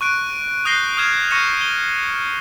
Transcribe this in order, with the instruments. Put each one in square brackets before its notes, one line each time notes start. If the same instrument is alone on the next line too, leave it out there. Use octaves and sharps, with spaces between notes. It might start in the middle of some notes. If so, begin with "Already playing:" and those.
[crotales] C#6 F#6 D7
D#6 F#6 G6 A#6 C7 G7
D#6 F6 G#6 E7
C#6 A#6 C#7 E7
G7